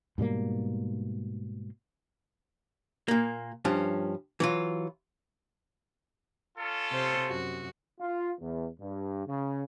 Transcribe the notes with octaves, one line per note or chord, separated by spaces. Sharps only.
G#2 B2 G3 A#3
A#2 A#3
G2 F3 C#4
E3 F#3 F4
C#4 F4 A4
C3 C5
F#2 F#4
F4
E2
G2
C#3